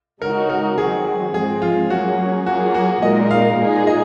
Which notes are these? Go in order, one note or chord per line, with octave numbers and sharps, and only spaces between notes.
C#3 G#3 D#4 F#4 A#4
A#4
D#3 F#3 C4 F#4 G#4
G#2 F3 G#3 C4 G#4
F4
F#3 A#3 C#4 F#4 G#4
F#3 A#3 F4 F#4 G#4
F#4
A#2 G#3 D#4 A#4 D#5
F5
A#2 G#3 D#4 G#4
D#5